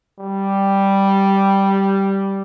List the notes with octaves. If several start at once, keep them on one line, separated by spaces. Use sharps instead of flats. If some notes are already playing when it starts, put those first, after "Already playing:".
G3